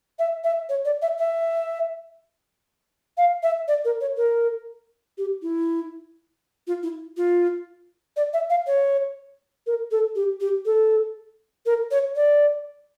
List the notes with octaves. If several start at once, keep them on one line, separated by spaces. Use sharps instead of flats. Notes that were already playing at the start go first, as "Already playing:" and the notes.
E5
E5
C#5
D5
E5
E5
F5
E5
D5
A#4
C#5
A#4
G4
E4
F4
E4
F4
D5
E5
F5
C#5
A#4
A4
G4
G4
A4
A#4
C#5
D5